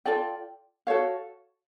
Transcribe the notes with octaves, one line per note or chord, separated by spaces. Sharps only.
F4 A4 D5 G5
F#4 A4 C#5 F5